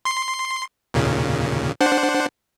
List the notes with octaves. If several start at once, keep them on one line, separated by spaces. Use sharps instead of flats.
C6 C7
D#2 A#2 C#3
D4 C5 F#5